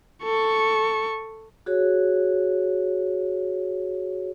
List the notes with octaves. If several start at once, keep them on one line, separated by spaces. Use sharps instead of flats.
A4 C#6
F#4 G#4 C#5